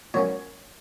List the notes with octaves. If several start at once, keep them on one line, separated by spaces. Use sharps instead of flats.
A#2 F#3 A#3 C#4 C#5